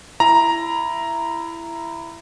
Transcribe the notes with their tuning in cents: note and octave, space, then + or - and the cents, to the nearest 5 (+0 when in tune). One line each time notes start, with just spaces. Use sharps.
E4 +20 A#5 +0